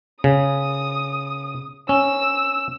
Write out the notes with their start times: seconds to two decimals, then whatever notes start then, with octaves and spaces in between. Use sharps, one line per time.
0.24 C#3 D#6
1.89 C#4 E6